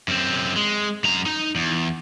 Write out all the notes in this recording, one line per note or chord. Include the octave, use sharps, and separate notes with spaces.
F#2 C4
G#3
F#2 A#5
D#4
E2